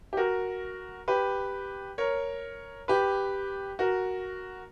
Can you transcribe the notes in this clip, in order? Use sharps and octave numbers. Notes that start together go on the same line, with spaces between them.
G4
F#4 A#4
G4 B4
A#4 C#5
G4 B4
F#4 A#4